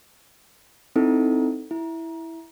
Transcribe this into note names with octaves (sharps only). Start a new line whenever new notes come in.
C4 D#4 E4 A4
E4